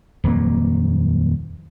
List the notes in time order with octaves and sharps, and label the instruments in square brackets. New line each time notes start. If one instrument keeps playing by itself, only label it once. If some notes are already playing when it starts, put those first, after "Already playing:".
[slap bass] D#1 F2 F#3 A#3